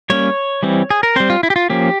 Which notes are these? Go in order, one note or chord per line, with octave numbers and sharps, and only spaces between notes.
G3 A#3 C#4 C#5
E3 G3 C4
G#4
A#4
G3 C4 C5
F4
E4
G4
F4
F3 A#3 C#4 G4